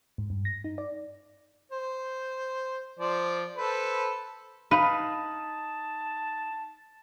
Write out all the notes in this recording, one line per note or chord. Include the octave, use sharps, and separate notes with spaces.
G#2
G2
A#6
D#4
D5
C5
F3 C5 D5
A4 B4 C5
D#4 B4 F5 A5